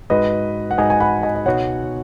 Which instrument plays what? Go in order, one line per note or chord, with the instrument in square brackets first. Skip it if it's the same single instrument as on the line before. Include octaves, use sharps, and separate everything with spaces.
[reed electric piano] G#2 G#3 D#4 F#4 [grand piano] B4 D#5
[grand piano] F#5
[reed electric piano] G#2 G#3 D#4 F#4 [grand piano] D#5 G#5
[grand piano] G#5
F#5 B5
D#5 G#5
D#5
[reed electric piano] C#2 B2 B3 D#4 F#4 [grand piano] C#5 F#5